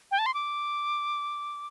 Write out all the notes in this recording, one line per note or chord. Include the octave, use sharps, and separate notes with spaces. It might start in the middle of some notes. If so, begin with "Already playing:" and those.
G5
A5
C6
D6